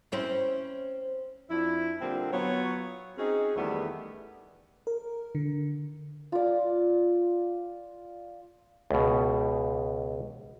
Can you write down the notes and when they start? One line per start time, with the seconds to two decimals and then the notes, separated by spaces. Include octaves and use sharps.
0.12 C4 C#4 E4
1.50 F2 F3 D4 E4
2.01 A#2 D3 G3 A#3 C4
2.33 F#3 B3 F4 C#5
3.18 C4 C#4 D#4 F#4 G#4
3.56 E2 D#3 G3 A3 B3 E4
4.87 A#4
5.35 D3
6.32 F4 D5
8.90 C#2 B2